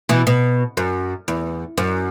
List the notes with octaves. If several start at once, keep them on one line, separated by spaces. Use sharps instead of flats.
B2 E3
B2
F#2
E2
F#2